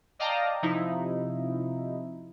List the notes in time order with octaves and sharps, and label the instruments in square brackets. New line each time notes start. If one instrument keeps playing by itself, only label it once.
[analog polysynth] D5 D#5 F5 G5 A5 A#5
C3 F3 D#4 E4